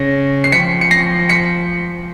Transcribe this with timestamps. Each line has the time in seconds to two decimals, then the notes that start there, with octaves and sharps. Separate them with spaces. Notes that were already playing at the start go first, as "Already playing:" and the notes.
Already playing: C#3 A#6
0.44 C7
0.52 F3 B6 C#7
0.81 C#7
0.91 A#6 C7
1.29 B6 C#7